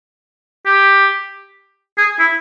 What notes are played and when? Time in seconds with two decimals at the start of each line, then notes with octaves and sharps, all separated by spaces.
0.66 G4
1.98 G#4
2.20 E4